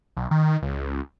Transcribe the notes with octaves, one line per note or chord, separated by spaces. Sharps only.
B1
D#3
C#2